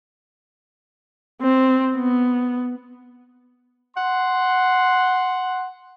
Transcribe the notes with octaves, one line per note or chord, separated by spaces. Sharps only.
C4
B3
F#5 C6